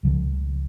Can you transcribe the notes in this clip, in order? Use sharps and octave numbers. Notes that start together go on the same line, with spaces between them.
C#2 C#3 F3